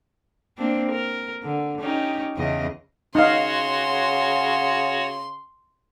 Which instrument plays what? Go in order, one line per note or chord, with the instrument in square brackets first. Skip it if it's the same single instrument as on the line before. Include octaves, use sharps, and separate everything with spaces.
[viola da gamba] A#3 C4 D4
A#4
D3
C#4 D#4 G4
E2 C#3 D#5
[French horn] C#3 [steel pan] D#4 F5 [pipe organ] F#4 C#5 F#5 [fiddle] C6